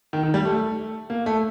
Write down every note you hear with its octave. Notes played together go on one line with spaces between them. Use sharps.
D#3
D#3
G3
A3
A#3
A3